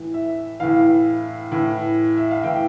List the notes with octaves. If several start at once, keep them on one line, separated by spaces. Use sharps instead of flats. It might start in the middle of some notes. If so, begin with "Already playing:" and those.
Already playing: A2 E3
E5
A2 E3 F5
A2 E3
E5
F5
A2 E3 G5